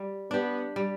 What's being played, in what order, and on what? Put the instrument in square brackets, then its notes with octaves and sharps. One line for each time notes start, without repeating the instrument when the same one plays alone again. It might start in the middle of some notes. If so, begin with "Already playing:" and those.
Already playing: [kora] G3
[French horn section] B3 [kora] D4 G4
[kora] G3